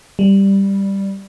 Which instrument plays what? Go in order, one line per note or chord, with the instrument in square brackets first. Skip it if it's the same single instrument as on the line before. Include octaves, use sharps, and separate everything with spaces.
[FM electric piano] G3